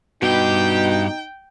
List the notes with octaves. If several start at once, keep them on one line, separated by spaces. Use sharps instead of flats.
G2 B2 D#4 G4 G5